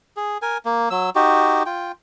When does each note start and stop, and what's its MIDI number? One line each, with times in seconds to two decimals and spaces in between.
0.17 0.38 68
0.42 0.58 70
0.42 0.58 80
0.65 0.89 58
0.91 1.10 54
0.91 1.10 88
1.15 1.63 63
1.15 1.63 66
1.15 1.63 67
1.66 1.92 65
1.66 1.92 79